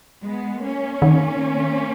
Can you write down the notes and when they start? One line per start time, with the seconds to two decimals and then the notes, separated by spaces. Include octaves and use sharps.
0.23 G#3 B3
0.62 A#3 C#4
1.02 D#3